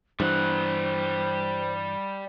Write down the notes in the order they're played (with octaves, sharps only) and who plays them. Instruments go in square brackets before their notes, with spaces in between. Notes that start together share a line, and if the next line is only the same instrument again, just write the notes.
[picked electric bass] G2 E3 [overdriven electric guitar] G3 F#5 [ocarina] C5